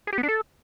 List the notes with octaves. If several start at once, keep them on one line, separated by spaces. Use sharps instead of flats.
G#4
G4
B3
D4
A4